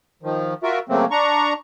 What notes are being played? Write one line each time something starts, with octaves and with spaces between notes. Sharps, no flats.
D#3 F3
F4 F#4 A#4 E5
C#3 F#3 A3 A#3 C4
D4 A#5 C#6